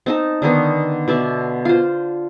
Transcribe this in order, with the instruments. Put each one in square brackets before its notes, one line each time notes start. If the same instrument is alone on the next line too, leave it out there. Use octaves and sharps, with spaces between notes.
[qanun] C4 D#4 A5
D3 D#3 B3 D#4
B2 D5 E5 A5
F4 C5